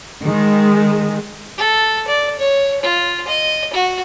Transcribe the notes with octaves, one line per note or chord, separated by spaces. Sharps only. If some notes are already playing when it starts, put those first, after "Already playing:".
D#3 G#3
A4
D5
C#5
F4
D#5
F#4